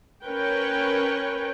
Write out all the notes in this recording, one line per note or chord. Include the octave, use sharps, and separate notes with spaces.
C#4 A#4 B4 C#5 G5